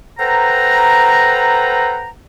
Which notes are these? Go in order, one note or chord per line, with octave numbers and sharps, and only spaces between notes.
A4 B4 C5 F#5 G5 A#5